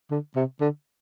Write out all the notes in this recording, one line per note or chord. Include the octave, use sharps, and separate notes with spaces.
D3
C3
D3